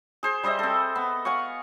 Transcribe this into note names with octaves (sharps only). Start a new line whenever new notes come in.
G#4 C5
G3 C5 D#5 E5
C4 A4
B3
F5 F#5 G#5 C#6